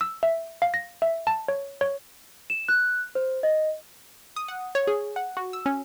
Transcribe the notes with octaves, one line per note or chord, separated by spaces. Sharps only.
E6
E5
F5
A#6
E5
A5
C#5
C#5
E7
F#6
C5
D#5
D#6
F#5
C#5
G#4
F#5
F#4
E6
C#4